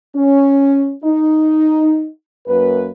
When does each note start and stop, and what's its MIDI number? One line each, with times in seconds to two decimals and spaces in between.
0.15 0.92 61
1.04 2.08 63
2.47 2.90 42
2.47 2.90 58
2.47 2.90 71